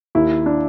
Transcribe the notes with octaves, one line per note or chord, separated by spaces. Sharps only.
D#2 E4
D4